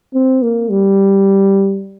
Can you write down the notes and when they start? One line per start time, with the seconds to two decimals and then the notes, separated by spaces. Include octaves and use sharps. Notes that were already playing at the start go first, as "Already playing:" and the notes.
0.14 C4
0.43 A#3
0.70 G3